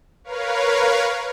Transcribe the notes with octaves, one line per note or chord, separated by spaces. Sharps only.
A#4 B4 C#5 F5